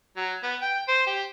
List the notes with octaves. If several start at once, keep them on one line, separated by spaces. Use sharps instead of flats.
F#3
B3
G5
C5
G4